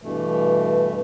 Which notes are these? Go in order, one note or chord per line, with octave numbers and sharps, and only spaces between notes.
G2 B2 E3 A3